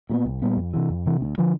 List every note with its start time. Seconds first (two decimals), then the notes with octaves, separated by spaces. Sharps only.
0.09 A#2 G3 B3
0.25 C2
0.42 A#2 G3 B3
0.57 F2
0.74 C3 E3
0.90 F2
1.06 C3 E3
1.21 D2
1.38 D3 F3